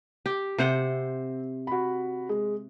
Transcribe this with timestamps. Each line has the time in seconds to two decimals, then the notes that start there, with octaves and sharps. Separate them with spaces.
0.26 G4
0.58 C3 C4 C5 F#5
1.67 F#4 B5
2.29 G#3